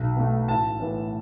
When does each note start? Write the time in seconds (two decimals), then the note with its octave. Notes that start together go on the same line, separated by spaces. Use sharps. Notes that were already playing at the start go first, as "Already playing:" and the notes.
Already playing: B1
0.16 B2 A3
0.48 A1 A5
0.80 A2 E3 B3